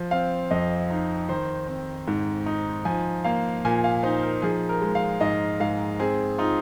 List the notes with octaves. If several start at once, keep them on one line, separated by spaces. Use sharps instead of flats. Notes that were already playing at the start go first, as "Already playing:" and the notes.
Already playing: F3
C4 F5
F2 D#5
D#4
D#3 C5
C4
G#2
D#4
F3 G#5
A#3 F5
A#2 G#5
F5
D#4 C5
A#4
F3 G#4
A#4
G#3
F5
G#2 D#5
G#2 F5
C4 G#4
D#4 F4